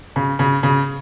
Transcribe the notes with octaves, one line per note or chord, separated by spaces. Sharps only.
C#3
C#3
C#3